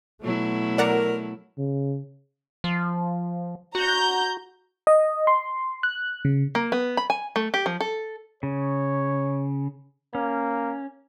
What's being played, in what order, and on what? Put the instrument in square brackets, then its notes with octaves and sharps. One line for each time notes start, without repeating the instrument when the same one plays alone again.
[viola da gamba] B2 F#3 E4 [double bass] A3
[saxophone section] A#4 [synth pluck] D5 F#5 A#5
[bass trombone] C#3
[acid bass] F3
[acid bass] F#4 [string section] A#5 G6
[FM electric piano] D#5
C6
F#6
C#3
[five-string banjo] A#3
B3
B5
G#5
A3
G4
F3
A4
[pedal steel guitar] C#3 [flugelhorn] C#5
[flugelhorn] A#3 [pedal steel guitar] C#4